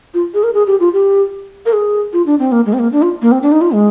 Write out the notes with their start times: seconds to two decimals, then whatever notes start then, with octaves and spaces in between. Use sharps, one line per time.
0.14 F4
0.34 G#4
0.43 A#4
0.54 G#4
0.67 G4
0.80 F4
0.94 G4
1.66 A#4
1.73 G#4
2.13 F4
2.26 D4
2.39 C4
2.52 A#3
2.66 G#3
2.73 C4
2.79 A#3
2.92 D4
3.02 F4
3.22 A#3
3.32 C4
3.42 D4
3.52 D#4
3.61 F4
3.72 G#3